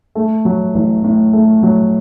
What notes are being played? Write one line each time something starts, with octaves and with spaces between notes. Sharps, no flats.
A3
F#3
A1
A2
A3
F#3